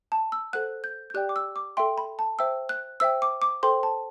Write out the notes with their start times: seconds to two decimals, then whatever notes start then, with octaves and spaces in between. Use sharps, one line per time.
0.12 A5
0.32 E6
0.53 A4 C5 F#5 F#6
0.84 G6
1.10 G6
1.14 G4 D5 G5 F#6
1.29 D6
1.36 E6
1.56 D6
1.77 A4 E5 G5 C6
1.98 B5
2.19 A5
2.39 C5 E5 G5 E6
2.69 F#6
3.00 C5 E5 G5 E6
3.22 D6
3.42 D6
3.63 A4 C5 G5 C6
3.83 A5